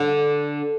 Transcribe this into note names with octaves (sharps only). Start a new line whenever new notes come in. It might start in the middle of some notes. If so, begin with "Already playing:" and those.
Already playing: D3